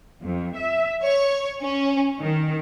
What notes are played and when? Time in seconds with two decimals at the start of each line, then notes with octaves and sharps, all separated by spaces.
0.23 F2
0.55 E5
1.03 C#5
1.62 C#4
2.22 D#3